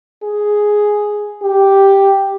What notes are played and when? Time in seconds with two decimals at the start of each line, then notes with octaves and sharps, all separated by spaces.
0.23 G#4
1.42 G4